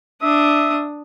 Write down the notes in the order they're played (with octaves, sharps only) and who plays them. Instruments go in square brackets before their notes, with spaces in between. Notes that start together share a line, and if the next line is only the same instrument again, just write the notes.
[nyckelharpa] D4 D#6 [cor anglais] E5